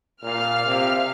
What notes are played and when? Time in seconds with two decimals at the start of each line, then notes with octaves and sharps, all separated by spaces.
0.23 A#2 F5 F6
0.66 C3